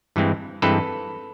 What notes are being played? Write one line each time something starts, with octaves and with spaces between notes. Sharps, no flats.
G2 E3 G#3 C4
G2 E3 G#3 C4 A4 B4